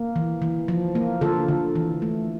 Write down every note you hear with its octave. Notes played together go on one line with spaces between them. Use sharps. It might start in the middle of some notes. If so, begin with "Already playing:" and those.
Already playing: A#3
E3
E3
F3
A#3
D3 F4 A4
D3
E3
A3